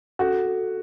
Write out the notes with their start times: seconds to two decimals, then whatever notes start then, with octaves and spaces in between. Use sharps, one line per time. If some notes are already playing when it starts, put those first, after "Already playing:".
0.19 F#4 A4
0.46 A4